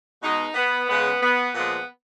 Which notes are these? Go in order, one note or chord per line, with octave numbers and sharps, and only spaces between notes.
B2 G#3 D#4
B3
C#3 G#3 B3
B3
A#2 F3 G#3 B3